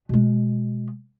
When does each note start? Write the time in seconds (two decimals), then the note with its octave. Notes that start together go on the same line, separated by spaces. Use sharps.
0.09 B2 G#3